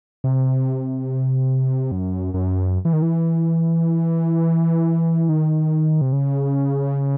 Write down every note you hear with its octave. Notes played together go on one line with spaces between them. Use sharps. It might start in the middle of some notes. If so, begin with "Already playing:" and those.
C3
F#2
F#2
E3
D#3
E3
D#3
C3
C#3